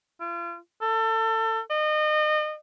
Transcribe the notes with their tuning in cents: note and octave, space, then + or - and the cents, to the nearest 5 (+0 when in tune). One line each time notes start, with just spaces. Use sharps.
F4 -35
A4 +30
D#5 -30